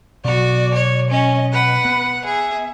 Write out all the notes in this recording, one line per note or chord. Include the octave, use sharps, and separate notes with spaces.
B2 F#3 F#4 D5
C#5
C#4 D#5
B4 F#5
B3
G#4 E5